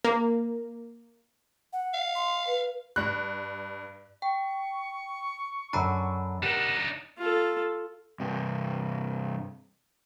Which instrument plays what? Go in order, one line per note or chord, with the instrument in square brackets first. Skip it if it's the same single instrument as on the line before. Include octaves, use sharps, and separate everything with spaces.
[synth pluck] A#3
[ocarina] F#5
[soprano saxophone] F5
[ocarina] C6
B4
[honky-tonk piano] G2 F#6
[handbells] G5 [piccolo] C#6
[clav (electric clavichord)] F#2 D3 D4 [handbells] A#5 B5 E6
[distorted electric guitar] D4 D#4 [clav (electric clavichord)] G4 A#4 [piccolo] F#5
[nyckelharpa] F4 A4
[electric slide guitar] G2 C3